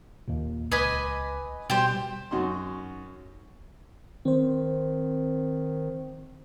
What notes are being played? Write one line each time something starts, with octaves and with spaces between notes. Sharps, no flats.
D#2 A#2
C#2 B4 D#5 G#5 D6 B6
B2 G3 G4 C5
F#2 D#4 F#4 C6
D#3 C4 C5